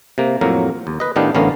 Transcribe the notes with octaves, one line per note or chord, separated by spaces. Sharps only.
C3 A#3
F2 A2 F#3 A#3 A#4
D#2
B4 D#5
A2 D#3 B3 D4 G4 F5
A1 D3 B3 C#4 A#4 F5